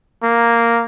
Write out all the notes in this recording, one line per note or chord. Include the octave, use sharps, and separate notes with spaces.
A#3